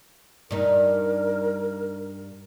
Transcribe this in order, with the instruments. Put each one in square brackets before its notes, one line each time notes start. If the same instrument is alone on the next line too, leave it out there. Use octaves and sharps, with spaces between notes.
[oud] G2 D#4 [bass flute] A#4